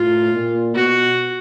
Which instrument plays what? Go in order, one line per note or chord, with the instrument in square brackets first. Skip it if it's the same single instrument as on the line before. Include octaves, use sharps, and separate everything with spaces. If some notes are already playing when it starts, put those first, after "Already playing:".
Already playing: [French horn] A2 [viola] F4
[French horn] A#2
[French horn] B2 [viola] F#4